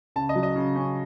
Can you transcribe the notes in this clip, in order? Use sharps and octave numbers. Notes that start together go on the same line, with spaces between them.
C#3 A5
D#5
F#3
D#5
C#3
C#4